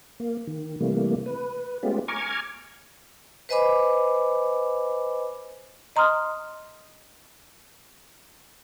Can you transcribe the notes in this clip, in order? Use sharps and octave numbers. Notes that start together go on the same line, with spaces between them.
A#3
D#3
C3 E3 G3 A3 A#3
B4
G#3 A3 B3 C#4 F4 G4
G#5 A#5 C#6 D6 F6 G#6
B4 C5 D#5 G#5 B5 D6
D#5 A#5 C6 D#6 F6